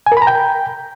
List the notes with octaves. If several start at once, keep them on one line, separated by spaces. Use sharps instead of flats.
G#5
A#4
B5
A#5
G5